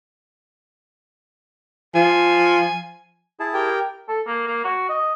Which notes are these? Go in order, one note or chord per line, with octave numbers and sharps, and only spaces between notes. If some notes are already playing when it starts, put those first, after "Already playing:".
F3 G#5
E4 G#4 A5
G4 A#4 G5
A4
A#3
A#3
F#4
D#5